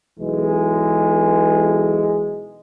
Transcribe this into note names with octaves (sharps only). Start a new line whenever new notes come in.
B1 E3 G#3